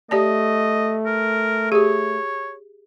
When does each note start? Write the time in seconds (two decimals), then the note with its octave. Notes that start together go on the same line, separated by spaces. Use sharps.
0.11 A3 G4 D5 D#5 A5
1.06 A#4
1.72 G4 G#4 C#5